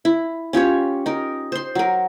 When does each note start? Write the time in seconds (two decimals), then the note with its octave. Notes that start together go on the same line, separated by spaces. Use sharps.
0.05 E4
0.53 C#4 F4 G4 C#5
1.06 D#4 A#4
1.52 C5 C6
1.75 F#3 A#4